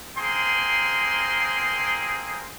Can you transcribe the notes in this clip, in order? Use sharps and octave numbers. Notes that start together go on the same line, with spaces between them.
A#3 C4 G#4 A#4 C6